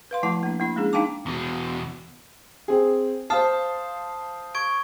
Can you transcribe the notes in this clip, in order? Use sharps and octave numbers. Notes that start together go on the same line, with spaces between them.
B4 F5 C6
F3 A3 E4 F#5 A5
A#3 D4
A#3 E4 B5
G#3 C#4 D4 G#4
D4 D#4 F5 G5 A5 D6
E2 B2
C4 G#4
C5 F5 A5 D#6 F6 C7
C#6 G#6 D7